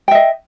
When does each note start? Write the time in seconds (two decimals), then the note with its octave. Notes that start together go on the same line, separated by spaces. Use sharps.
0.08 G5
0.11 E5
0.15 D#5